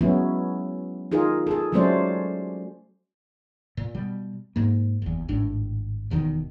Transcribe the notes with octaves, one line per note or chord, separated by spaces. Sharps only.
F#3 G#3 B3 C#4 E4
D#4 F4 G#4 A#4
G#4 A4
F#3 G#3 A3 C#4 C5 D5
A#2
B2 G3
G#2 A#3
F#1 E2
G#1 A2 D4
E1 E2 B2 D#3